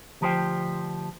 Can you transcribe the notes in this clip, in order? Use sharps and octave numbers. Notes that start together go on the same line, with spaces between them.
D2 F3 G4 A#4 C5 G5